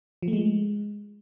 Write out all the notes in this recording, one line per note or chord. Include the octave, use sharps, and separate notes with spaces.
F3
A3
G#3